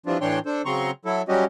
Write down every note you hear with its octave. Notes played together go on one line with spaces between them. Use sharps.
E3 F3 G3 C4 D4 F4
A2 E3 D4 C#5 G5 C6
D4 A4 C5
C#3 F#3 C4 A#5 C6 C#6
F#3 E4 A4
F#3 G3 C#4 F#4 G4 D#5